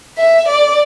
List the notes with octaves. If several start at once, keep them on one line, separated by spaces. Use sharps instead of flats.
E5
D5